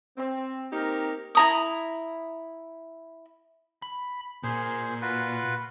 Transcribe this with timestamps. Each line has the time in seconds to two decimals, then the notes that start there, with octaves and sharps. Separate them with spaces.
0.17 C4
0.72 A#3 C4 D#4 G4 A#4
1.35 E4 A#5 D#6
3.82 B5
4.43 A#2 G#4 C5
5.02 F4 F#4 B4